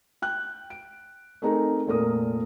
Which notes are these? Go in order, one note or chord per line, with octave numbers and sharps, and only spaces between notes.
G5 F#6
D7
A3 C4 D#4 G#4 A#4
F1 A#2 A#4 D#6